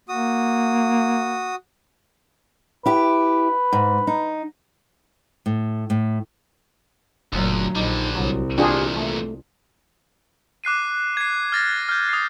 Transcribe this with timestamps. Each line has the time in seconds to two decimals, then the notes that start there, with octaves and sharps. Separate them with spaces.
0.09 A#3 F#4 D#6
2.86 E4 G4 B4
3.73 G#2
4.07 D#4
5.46 A2
5.90 A2
7.33 F#1 D2 A#2 F#3
7.75 A#1 D3 G3 D#4
8.15 C2 F#3
8.58 E2 A#2 D4 F4 G4 G#4
8.96 A3
10.64 D6 F#6 C7 D#7
11.17 G#6 C7
11.52 F6 A6 A#6
11.89 F6 G6
12.09 D#6 C7